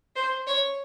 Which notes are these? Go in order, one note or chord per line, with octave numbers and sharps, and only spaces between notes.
C5
C#5